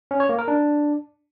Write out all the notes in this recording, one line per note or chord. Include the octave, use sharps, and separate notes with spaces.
C#4
C#5
A#3
A#4
D4